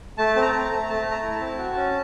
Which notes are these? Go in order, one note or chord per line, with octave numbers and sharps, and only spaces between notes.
A3 A5
C4 A5
A#5
A3
A#5
A3
A3 A5
A3
A#5
E4
A5
C4
F#4
C#4